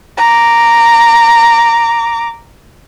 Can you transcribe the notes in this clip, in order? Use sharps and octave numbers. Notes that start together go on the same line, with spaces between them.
A#5 D6